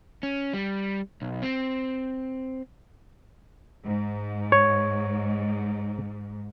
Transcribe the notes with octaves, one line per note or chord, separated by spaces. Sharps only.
C#4
G3
B1
C4
G#2
C#5